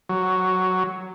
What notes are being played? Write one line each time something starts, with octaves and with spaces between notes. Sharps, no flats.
F#3